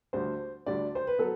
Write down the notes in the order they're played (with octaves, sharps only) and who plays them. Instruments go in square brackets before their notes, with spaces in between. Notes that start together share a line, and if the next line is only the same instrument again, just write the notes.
[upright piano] D2 D3 G3 [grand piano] C5
[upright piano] D2 D3 G3 [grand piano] D5
[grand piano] C5
B4
[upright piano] F#3 B3 [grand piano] A4